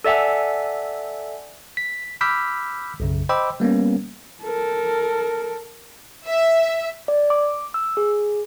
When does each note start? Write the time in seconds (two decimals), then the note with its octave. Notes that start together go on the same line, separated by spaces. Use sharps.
0.04 A4 D5 E5 F#5 G#5
1.77 B6
2.21 B5 D6 E6 F6 G6 B6
3.00 B1 F#2 C#3
3.29 C5 D#5 G5 B5 D6 E6
3.60 G3 A#3 B3 C#4
4.43 A4 A#4
6.25 E5
7.08 D5
7.30 D6
7.74 E6
7.97 G#4